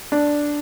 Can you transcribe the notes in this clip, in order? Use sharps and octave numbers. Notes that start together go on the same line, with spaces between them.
D4